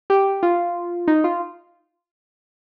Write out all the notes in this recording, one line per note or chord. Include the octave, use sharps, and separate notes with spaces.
G4
F4
D#4
F4